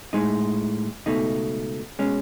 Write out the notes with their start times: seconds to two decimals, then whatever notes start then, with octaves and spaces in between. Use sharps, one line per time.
0.13 A2 G#3 D#4
1.06 C#2 B2 A3 D#4
1.99 B2 G#3 C#4